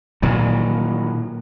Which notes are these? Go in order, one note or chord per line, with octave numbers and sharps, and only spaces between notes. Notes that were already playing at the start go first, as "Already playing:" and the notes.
A#2 D#3 E3 F#3